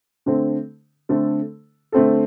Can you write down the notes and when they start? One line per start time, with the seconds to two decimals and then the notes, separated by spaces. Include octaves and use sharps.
0.26 D3 A3 C4 A4
1.09 D3 A3 C4 A4
1.92 D3 A3 C4 A4